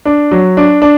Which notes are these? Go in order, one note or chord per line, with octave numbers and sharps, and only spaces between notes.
D4
F#3
D4
D4